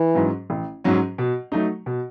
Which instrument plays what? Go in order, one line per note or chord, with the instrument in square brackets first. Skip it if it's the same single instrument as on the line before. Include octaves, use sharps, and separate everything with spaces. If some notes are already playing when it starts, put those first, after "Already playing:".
Already playing: [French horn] E3
[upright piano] G#2 F#3 C#4
A1
G#2 F#3 C#4
B2
F#3 A3 D#4
B2